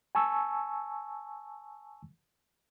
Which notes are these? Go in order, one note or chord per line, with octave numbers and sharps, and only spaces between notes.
G#5 A5 C#6 E6